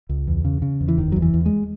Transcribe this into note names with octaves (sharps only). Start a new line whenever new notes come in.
C#2
E2
C#3
C#3
E2
E3
F#1 D#3
E2 F#3
E3
E2
G#3